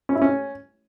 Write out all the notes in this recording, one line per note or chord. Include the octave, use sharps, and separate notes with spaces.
C#4
E4
C#4